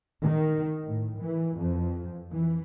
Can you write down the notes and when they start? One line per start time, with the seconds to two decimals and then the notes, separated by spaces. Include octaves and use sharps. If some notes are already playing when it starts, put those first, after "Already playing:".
0.22 D#3
0.88 A2
1.20 E3
1.58 F2
2.32 E3